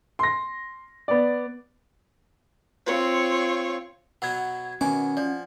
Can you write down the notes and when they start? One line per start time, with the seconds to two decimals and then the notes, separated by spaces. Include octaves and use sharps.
0.19 C6 A#6
1.08 B3 D5
2.87 C4 F4 C#5
4.22 B2 F#3 B3 F#5 G#6
4.81 B2 D#3 C#4 G#5 D6
5.17 F3 D5